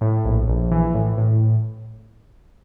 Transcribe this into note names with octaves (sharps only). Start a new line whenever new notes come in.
A2
A#1
A#1
E3
A2
A2